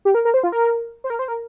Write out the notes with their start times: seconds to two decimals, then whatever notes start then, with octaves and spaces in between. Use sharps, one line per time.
0.05 G4
0.14 A#4
0.25 A#4
0.34 C5
0.43 F4
0.52 A#4
1.04 C5
1.10 A#4
1.19 C5
1.28 A#4